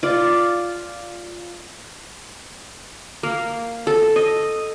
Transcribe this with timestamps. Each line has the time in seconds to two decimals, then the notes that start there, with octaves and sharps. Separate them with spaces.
0.03 F4 D5
3.23 A#3
3.87 A4
4.16 D#5